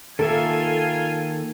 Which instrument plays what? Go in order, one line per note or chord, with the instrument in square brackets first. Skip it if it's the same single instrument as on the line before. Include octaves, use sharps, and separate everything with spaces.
[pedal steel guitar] D#3 A#3 E5 [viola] F4 G#5 [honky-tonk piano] A4